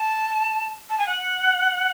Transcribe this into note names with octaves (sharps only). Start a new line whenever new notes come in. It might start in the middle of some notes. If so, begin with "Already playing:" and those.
Already playing: A5
A5
G#5
F#5